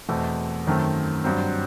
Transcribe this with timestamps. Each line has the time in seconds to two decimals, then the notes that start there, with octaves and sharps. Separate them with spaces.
0.09 E2 B2 A3 C4
0.67 F#2 D#3 A3 C4
1.24 G2 F#3 C4